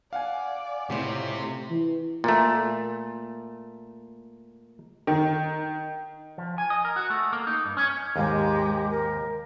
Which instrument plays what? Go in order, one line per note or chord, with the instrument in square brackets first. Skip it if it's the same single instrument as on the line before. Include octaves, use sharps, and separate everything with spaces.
[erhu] D5 [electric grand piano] F5 F#5 G#5
[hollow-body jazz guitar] C#2 A2 [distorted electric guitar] C3
[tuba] E3
[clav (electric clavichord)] A#2 A3
[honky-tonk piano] D#3
[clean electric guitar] F3
G#5
D#5
A#4
F#4
A3
A#3
D#4
G2
C#4
[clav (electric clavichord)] D#2 G#2 [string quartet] G#3 [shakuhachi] G4
[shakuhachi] A#4